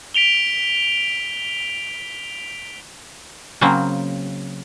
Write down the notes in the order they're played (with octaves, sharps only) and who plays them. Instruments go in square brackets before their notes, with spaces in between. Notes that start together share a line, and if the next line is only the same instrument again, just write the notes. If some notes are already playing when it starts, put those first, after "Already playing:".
[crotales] B6 D7 F7 G7
[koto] C#3 F#3 A#3 C4